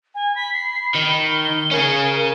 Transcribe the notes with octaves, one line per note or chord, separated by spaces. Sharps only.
G#5
B5 B6
C7
D#3 G7
C#4 G#4 A#4